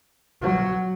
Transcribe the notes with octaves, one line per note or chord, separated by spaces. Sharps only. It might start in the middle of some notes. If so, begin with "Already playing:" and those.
F#3